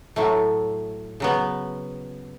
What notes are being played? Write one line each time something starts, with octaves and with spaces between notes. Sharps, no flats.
A2 F#3 A3
C#3 F#3 B3